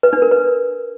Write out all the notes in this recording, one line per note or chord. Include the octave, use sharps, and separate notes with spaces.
B4
D4
A#4
B4